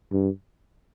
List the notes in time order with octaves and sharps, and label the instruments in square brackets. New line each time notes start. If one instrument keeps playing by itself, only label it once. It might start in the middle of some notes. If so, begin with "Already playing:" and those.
[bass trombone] G2